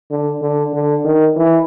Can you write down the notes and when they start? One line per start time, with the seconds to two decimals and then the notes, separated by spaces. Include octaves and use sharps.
0.11 D3
0.42 D3
0.73 D3
1.04 D#3
1.36 E3